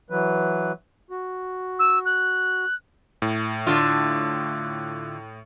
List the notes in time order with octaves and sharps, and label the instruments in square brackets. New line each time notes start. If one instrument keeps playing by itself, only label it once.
[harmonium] E3 F#3 B4
F#4
[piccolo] E6
F#6
[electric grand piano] A2
[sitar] D3 F4